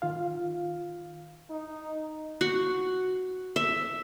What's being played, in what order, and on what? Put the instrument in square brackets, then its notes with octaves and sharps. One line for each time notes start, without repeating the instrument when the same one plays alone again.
[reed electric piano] D#3 F4 F5
[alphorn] D#4
[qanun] F#4
E5